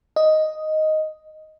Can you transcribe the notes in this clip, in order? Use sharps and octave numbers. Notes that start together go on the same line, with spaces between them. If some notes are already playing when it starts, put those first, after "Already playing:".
D#5